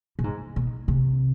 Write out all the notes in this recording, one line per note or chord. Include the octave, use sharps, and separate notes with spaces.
B2
G#2
B2
C3